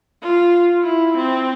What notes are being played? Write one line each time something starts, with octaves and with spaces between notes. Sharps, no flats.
F4
E4
C4